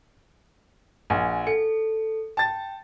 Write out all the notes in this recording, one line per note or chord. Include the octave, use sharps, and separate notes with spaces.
A#1 F#5 G#5
A4 C#7
G5 A5 A6